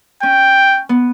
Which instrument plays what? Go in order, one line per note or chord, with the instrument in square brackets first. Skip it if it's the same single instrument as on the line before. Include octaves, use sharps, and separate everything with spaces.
[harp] C#4 [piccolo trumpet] G5
[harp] B3